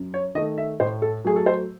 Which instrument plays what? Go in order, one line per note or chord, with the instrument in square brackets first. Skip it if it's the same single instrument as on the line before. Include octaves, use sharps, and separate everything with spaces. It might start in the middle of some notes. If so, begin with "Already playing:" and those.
Already playing: [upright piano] F#2
C#5
D#3 A3 D#5
E5
A2 C5
A4
F#3 A3 G#4
A4
C5